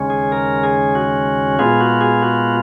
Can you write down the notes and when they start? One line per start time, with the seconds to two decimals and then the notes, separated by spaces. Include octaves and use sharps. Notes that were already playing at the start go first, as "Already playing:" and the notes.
Already playing: D#2 C#3 G#3 C#4
0.10 G#4
0.32 A#4
0.63 G#4
0.95 F#4
1.59 A#2 G#3 B3 F4 G#4
1.80 F#4
2.01 G#4
2.22 F#4